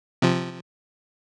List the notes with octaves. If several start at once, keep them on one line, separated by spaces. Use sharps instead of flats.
C3 F3